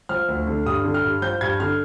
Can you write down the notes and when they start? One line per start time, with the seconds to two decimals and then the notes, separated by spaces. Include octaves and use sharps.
0.09 F3 F6
0.28 D2
0.47 D3
0.65 G2 D#6
0.85 D3
0.94 F6
1.04 G2
1.22 F3 G6
1.41 G2 G#6
1.60 D3 F6